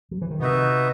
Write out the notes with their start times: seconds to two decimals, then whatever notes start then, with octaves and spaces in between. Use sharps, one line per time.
0.11 F#3
0.22 E3
0.31 D#3
0.39 C3 B3 D#4 F#4 B4 E5